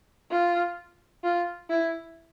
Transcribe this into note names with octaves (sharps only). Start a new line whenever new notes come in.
F4
F4
E4